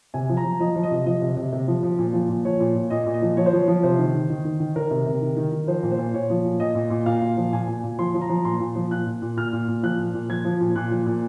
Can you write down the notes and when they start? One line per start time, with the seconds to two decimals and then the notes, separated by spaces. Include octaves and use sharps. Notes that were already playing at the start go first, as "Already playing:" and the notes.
0.14 C3 G#5
0.29 F3
0.37 A#5
0.44 F3
0.60 F3 D#5
0.76 F3
0.83 D#5
0.91 C3
1.06 F3 D#5
1.22 C3
1.37 C3
1.53 C3
1.68 F3
1.83 F3
1.99 A#2
2.13 F3
2.29 A#2
2.45 F3 C#5
2.60 A#2
2.75 A#2
2.90 A#2 D#5
3.06 A#2
3.14 D#5
3.22 F3
3.37 F3 C#5
3.46 C5
3.53 F3 C#5
3.68 F3
3.83 C3 C5
3.99 D#3
4.14 D#3
4.30 D#3
4.45 D#3
4.60 D#3
4.76 D#3 A#4
4.91 C3
5.06 C3
5.21 D#3
5.37 D#3
5.52 D#3
5.67 F3 C5
5.83 A#2
5.91 C5
5.98 A#2
6.14 A#2 C#5
6.30 F3
6.45 A#2
6.60 A#2 D#5
6.75 A#2
6.90 A#2
7.06 A#2 F5
7.22 A#2
7.37 F3
7.53 A#2 G#5
7.68 A#2
7.83 A#2
7.98 F3 C6
8.14 F3
8.21 A#5
8.30 F3
8.44 A#2 C6
8.60 A#2
8.75 F3
8.91 A#2 F#6
9.06 A#2
9.22 A#2
9.37 A#2 F6
9.53 A#2
9.68 A#2
9.83 F3 F#6
9.99 A#2
10.14 A#2
10.29 F3 G#6
10.45 F3
10.61 A#2
10.76 A#2 F#6
10.91 F3
11.07 A#2